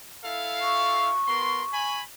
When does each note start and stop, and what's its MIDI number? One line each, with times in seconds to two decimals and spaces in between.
0.23 1.12 64
0.23 1.12 69
0.23 1.12 77
0.61 1.97 85
1.27 1.62 59
1.27 1.62 70
1.27 1.62 84
1.72 2.01 80
1.72 2.01 83